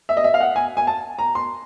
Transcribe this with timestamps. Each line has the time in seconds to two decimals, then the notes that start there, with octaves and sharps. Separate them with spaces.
0.09 E5
0.17 D#5
0.24 E5
0.34 F5
0.40 F#5
0.56 G#5
0.77 G#5
0.87 A5
1.19 A#5
1.35 C6